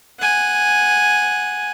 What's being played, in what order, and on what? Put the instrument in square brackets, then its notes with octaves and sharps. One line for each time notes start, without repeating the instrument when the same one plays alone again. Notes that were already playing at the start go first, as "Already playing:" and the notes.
[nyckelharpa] F#5 G#5